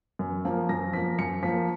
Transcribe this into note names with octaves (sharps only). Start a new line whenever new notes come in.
F#2
F3 A#3
F#2 A#6
F3 A#3 B6
F#2 C#7
F3 A#3 B6